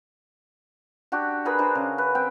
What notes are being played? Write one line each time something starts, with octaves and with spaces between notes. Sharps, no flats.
D4 F#4 G4
G#4 A#4 B4 B5
D4 C5 A#5
C#3
B4
C4 G5